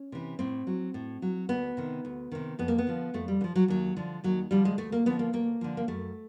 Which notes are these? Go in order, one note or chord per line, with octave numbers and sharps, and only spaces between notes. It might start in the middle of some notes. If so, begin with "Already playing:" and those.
Already playing: C#4
C3 E3
A2 C4
F#3
A2
F#3
D2 B3
C3 D#3
D2
C3 D#3
F2 B3
A#3
B3
D3 F3
F2 A3
G3
D3
F3
F#3
D#2 F#3
D3 F3
D#2 F#3
D3 F3 G3
G#3
D2 A3
A#3
D3 F3 B3
A#3
D2 A#3
D3 F3
A#3
F#2 A3